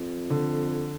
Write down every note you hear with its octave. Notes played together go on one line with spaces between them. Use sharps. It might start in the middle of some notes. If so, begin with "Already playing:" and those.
Already playing: F2
D3